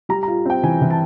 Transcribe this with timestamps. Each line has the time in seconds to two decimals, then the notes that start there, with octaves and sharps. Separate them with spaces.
0.09 G3 A#5
0.23 A#5
0.28 F4
0.46 C4 G5
0.63 E3 G#5
0.82 E3
0.90 A5